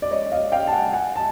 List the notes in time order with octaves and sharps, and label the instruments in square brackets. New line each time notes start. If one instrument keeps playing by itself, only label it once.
[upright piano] D5
C#5 D#5
D#5 F5
F5 G5
A5
F#5 G#5
F#5 G#5
A5